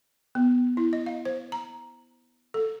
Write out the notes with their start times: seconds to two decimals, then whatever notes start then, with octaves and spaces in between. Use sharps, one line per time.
0.35 B3
0.77 E4
0.93 D#5
1.06 F5
1.25 C5
1.52 A#5
2.54 A4